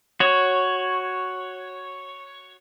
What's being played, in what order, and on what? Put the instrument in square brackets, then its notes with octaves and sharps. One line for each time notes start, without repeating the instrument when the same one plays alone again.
[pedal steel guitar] F#4 C#5